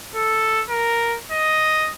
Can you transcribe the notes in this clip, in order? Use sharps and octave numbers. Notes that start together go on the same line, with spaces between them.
A4
A#4
D#5